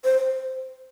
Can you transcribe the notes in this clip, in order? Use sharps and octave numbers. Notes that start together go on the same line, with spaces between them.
C5